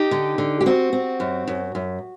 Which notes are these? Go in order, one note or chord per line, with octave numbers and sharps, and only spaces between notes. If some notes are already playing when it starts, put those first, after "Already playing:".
Already playing: D#4 G4
D3
D3
G4
C4 F#4
C4
F#2
F#2
F#2